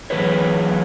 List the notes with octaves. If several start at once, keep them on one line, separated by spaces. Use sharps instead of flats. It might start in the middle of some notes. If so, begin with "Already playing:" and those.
E3 F#3 G#4 B4 C#5